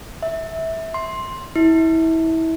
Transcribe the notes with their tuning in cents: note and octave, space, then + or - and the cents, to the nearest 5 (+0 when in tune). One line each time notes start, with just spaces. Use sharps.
E5 -15
C6 +10
E4 -25